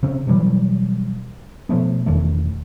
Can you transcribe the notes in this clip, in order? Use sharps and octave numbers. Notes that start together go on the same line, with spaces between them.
C#3 C4
B2 E3 F#3 G3
B2 F3 A3 B3
E1 D#3 A3